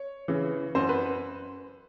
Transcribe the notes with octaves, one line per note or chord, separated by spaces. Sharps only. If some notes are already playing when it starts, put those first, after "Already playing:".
Already playing: C#5
C#3 E3
F#2 C5
B4